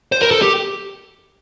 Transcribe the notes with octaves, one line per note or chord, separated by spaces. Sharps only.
C5
A#4
A4
G4